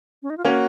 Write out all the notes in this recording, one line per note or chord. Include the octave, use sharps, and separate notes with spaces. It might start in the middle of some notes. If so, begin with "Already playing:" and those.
C#4
D#4
F4
A#3 C#4 F#4